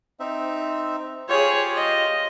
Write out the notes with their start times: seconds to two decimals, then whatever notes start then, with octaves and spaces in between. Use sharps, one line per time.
0.20 C4 D#4 E5
1.29 F4 G4 G#4 C5 C#5
1.75 D#5